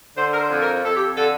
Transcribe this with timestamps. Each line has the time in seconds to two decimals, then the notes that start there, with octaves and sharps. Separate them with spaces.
0.17 D3 C5
0.32 A#4
0.39 C5
0.50 F2
0.61 A#4
0.84 F2 A4
0.94 G4
1.04 A4
1.17 D3 A4